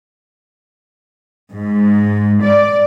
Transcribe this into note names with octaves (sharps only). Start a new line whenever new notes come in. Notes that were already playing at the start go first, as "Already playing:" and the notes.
G#2
D5